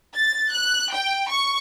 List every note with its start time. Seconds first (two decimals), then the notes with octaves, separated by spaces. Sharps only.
0.15 A6
0.52 F#6
0.92 G5
1.29 C#6